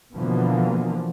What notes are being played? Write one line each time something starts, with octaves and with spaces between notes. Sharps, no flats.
B2 D3 E3 F3 A#3